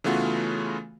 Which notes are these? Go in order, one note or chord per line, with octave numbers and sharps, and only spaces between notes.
C#3 E3 A3 B3 F4 F#4